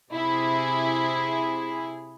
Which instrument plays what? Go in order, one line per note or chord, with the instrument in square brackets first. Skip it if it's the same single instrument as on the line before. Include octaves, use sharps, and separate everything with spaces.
[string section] C3 E4 G#4